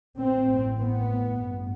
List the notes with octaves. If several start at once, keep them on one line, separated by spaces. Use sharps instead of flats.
A1 A2 C4
B3
A1 G2